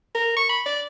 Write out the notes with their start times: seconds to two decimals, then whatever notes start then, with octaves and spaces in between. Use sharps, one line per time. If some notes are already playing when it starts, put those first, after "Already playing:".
0.15 A#4
0.37 C#6
0.49 B5
0.66 D5